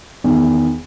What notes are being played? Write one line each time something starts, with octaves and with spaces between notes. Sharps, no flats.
E2 D#3